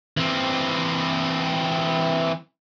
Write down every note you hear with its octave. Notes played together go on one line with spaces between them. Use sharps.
E3 C4